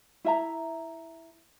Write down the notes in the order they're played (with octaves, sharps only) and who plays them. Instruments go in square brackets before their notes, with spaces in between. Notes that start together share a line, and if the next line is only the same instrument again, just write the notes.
[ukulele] E4 E5 A#5